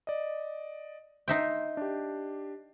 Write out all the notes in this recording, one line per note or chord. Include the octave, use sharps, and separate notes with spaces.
D5 D#5
D#4 E5 G5 C6 C7
D4 G4